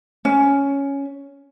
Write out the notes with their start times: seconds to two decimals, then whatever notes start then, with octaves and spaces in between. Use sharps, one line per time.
0.25 C#4